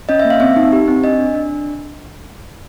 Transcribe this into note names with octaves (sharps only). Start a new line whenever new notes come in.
C#4 D#5
E5
A#3
F5
C4 E5
D#4
G4
C4
D4 D#5
D4
D4